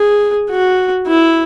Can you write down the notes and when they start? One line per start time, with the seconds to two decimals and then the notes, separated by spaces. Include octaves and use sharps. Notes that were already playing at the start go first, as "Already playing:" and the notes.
Already playing: G#4
0.50 F#4
1.07 E4